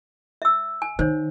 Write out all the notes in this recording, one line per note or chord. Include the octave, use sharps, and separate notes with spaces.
E5 E6
G#5
D#3 C5 C#5